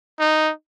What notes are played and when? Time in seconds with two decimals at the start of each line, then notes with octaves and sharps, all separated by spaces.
0.20 D#4